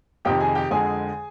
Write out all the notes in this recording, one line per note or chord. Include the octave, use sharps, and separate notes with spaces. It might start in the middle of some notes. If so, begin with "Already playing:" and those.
F2 C3 D#3 G4 G5
G#4 G#5
G4 G5
F2 D3 G#3 G#4 G#5